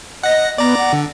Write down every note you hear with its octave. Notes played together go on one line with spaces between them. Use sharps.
D#5 F#5 A#6
B3 D5 A#5
F#5
D3